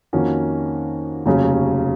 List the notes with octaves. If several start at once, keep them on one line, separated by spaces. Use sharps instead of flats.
F2 D#3 A#3 C#4 F#4
F1 D#2 C#3 F#3 C#4